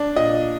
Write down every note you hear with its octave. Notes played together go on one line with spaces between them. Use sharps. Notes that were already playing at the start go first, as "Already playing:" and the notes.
Already playing: D4
A#2 D#5